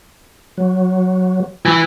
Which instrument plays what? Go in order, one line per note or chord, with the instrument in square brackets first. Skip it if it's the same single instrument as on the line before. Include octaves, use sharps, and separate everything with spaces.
[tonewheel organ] F#3
[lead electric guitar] E3